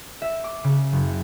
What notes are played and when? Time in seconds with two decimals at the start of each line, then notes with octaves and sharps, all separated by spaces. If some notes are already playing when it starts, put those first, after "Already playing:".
0.22 E5
0.44 D6
0.64 C#3
0.93 F#1